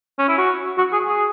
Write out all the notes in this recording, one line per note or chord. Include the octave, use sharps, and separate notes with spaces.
C#4
E4
F#4
F#4
G#4
G#4